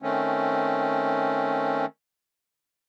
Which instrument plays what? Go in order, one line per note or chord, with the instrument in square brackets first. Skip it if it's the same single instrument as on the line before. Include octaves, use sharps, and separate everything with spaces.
[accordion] D#3 A3 C4 C#4